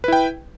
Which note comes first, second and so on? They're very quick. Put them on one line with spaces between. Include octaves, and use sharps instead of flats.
B4 E4 G5